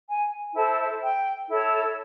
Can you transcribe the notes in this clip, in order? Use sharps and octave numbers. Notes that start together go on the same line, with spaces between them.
G#5
E4 A4 C5 A5
E5
G5
E4 A4 C#5